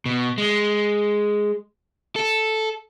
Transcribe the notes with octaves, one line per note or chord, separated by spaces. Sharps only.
B2
G#3
A4